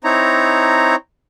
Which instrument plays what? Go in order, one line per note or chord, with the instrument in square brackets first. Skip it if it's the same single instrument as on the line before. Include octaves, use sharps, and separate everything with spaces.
[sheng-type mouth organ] C4 D#4 E4 C#5 A#5